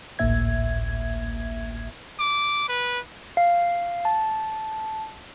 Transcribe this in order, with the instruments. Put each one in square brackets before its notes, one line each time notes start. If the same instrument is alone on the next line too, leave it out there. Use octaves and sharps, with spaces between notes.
[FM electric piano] G#1 C#2 A2 A#3 E5 G#6
[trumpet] D6
B4
[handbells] F5
A5